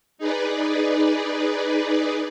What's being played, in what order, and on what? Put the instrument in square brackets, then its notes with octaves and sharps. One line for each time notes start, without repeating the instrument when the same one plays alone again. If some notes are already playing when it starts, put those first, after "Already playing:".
[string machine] D#4 G#4 B4 D5